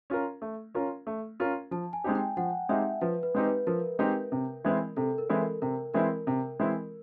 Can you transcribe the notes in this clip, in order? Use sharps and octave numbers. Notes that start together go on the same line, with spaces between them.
C#4 F4 A#4
A3
C#4 F4 A#4
A3
C#4 F4 A#4
F3 A5
G#5
G#3 C4 D#4 G4
G5
F3 F#5
G#3 C4 D#4 G4 E5
F3 B4
B4
G#3 C4 D#4 G4
B4
F3 A#4
G#3 C4 D#4 G4
C3
E3 G#3 C4 E4
C3 A4
A#4
E3 G#3 C4 E4
A#4
C3 A#4
E3 G#3 C4 E4 A#4
C3
E3 G#3 C4 E4